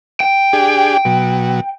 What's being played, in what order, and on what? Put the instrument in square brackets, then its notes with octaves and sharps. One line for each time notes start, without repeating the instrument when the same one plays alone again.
[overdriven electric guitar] G5
[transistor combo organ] D4 G4 G#4
B2 F#3